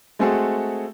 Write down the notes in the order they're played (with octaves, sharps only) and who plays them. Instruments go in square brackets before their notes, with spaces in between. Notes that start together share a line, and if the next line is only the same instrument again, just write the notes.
[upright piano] G#3 A3 C4 F#4 G#4 A4